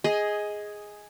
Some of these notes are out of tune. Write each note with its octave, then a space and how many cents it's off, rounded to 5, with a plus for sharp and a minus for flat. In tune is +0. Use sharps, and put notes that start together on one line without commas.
G#4 +0 D#5 +15